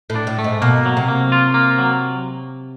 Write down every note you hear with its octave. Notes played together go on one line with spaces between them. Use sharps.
A2
D4
A2
A3
G#2
B2 A#3
F#3
C3
A#3
F4
A#3
F#3